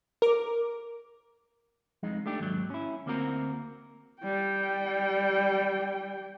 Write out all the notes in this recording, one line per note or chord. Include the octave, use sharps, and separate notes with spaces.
A#4 D6
F2 G#3 D#4
A3 D4 G4
D#2 G#2 F#3
C#4 E4
D2 A#3 C4 F#4 A#4
G3 G5